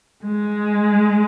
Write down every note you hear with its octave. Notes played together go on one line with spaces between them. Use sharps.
G#3